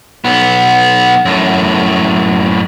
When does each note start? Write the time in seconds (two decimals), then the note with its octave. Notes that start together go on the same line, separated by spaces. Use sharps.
0.24 B1 B3
1.25 F#2 A2